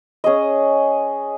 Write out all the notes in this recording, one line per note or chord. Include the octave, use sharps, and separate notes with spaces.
C#4 G#4 D#5